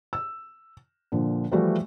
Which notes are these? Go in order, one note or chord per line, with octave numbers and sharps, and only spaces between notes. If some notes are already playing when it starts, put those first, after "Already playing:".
E6
A#2 D3 F3
E3 F3 G3 A3 F#4 D5